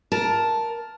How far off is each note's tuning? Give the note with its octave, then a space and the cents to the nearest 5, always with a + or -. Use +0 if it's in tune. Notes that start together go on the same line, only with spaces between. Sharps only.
A#4 +10 A5 +0